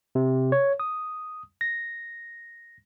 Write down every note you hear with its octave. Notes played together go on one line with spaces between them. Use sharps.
C3
C#5
D#6
A#6